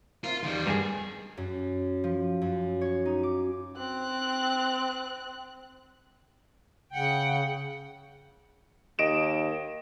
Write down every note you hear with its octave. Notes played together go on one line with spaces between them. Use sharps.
C4 E4 F4 A#4
E2 D#3 G3
G2 G#4
F#2
F3
F#2
C#5
D#4
D6
C4 F#6
C#3 F#5 G5
D#2 D#5 D7 E7